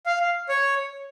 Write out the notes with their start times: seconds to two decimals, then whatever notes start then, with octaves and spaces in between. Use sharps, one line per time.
0.06 F5
0.49 C#5